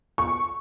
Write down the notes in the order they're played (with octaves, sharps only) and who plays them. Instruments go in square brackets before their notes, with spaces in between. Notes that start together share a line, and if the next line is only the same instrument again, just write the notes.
[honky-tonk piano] C#6